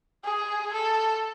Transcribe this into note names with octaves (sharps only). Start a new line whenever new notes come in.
G#4
A4